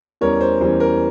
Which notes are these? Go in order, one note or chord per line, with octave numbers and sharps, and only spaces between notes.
E2 E3 G3 C#4 A#4 C#5
C5
E2 E3 G3 C#4 C5
A#4